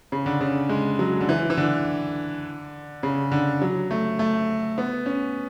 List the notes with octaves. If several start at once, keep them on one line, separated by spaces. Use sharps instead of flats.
C#3
D3
C#3
G#3
F#3
D3
E3
E3
D3
C#3
D3
F#3
A3
A3
B3
C#4